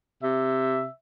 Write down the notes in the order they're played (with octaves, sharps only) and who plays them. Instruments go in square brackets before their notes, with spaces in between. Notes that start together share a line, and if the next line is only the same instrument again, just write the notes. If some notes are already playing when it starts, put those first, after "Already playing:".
[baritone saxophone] C3 [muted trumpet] E5